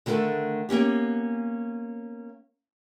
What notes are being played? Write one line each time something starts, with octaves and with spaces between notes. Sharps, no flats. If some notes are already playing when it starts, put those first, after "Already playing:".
D3 D#3 A3 A4 B4
A#3 B3 C#4 G4